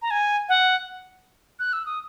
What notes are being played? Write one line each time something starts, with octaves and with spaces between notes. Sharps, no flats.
A#5
G#5
F#5
F#6
E6
D#6